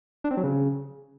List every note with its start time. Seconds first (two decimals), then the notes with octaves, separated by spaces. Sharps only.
0.24 D4
0.31 C4
0.37 F#3
0.44 C#3